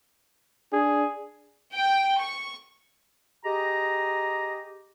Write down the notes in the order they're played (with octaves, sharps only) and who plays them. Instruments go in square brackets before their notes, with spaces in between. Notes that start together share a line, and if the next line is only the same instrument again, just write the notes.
[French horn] D4 [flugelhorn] G#4
[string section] G5
C#6
[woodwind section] G4 G#4 D#5 A#5